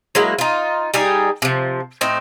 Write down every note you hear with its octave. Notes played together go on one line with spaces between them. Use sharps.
F#3 G#3 A#3 E4
D#4 F4
G3 D#4 G4 G#4
C3 F3
A2 C4 D#4